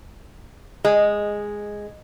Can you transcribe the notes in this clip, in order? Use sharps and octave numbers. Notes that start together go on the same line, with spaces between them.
G#3